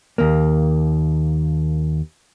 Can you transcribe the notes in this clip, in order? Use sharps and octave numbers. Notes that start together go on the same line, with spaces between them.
D#2 A#3